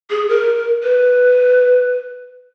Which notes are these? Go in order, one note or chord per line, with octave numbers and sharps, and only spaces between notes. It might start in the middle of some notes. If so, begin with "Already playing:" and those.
G#4
A#4
B4